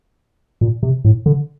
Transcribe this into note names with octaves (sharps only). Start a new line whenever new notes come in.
A#2
C3
A2
D3